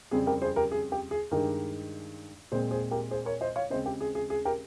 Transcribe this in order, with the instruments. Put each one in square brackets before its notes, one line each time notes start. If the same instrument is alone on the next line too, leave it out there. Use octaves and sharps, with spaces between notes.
[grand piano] F2 C#3 G3 C4 G#4
G4 A#4
G#4 C5
G4 A#4
G#4
G4
G#4
G2 D#3 G#3 G4 A#4
A#2 G#3 C4 G#4 C5
G#4 C5
G4 A#4
G#4 C5
A#4 C#5
C5 D#5
C#5 F5
C#3 G#3 C4 C5 D#5
G4
G#4
G#4
G#4
G4 A#4